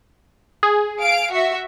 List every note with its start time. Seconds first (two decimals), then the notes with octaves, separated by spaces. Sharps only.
0.63 G#4
1.00 F5 D7
1.32 F#4 E5